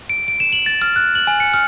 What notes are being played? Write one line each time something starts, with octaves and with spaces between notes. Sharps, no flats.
D7
D7
E7
F#7
A6
F6
F#6
F#7
G#5
C#7
F6